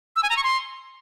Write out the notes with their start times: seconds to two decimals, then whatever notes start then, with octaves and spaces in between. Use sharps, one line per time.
0.16 E6
0.23 G#5
0.30 A#5
0.37 C#6
0.44 C6